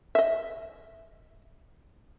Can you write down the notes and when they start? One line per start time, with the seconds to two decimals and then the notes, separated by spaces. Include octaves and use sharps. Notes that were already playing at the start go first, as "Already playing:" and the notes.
0.15 D#5 E5